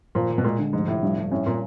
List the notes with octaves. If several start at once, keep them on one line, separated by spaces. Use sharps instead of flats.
A#2 F3
F3
B2
A#2 G#3
D3
F1 G#2
F1 A2
G2
G2
A2 C#4
A#2 C#4